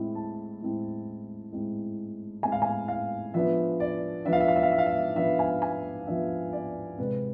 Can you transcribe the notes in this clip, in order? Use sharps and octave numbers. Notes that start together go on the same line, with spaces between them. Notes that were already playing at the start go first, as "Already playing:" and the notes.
Already playing: A2 G#3 C4 E4
A5
A2 G#3 C4 E4
A2 G#3 C4 E4
A2 G#3 C4 E4 G#5
F5
G#5
F5
F3 B3 D4 E5
D5
F3 B3 D4 E5
F5
E5
F5
E5
F5
E5
F5
E5
F3 B3 D4 E5
G#5
G#5
F3 B3 D4 E5
D5
C3 G#3 C4 B4